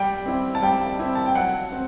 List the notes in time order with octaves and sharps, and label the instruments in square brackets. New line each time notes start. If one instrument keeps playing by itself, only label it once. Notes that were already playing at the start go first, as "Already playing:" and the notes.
Already playing: [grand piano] G3 [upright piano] G5
[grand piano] C4 E4 G4
[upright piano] A5
[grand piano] G3 [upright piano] G5
[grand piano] C4 E4 G4
[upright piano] A5
G5
[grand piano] F#3 [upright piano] F#5
[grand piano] C4